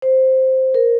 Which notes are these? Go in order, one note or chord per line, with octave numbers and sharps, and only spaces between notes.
C5
A#4